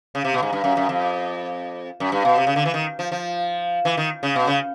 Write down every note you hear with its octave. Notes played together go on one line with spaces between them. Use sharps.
C#3
C3
B2
G#2
G2
F#2
F#2
F2
F#2
G2
B2
C3
C#3
D3
E3
D#3
F3
F3
E3
D#3
C#3
B2
C#3